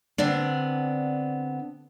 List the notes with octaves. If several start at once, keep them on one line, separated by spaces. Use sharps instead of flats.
D3 B3 C4 D4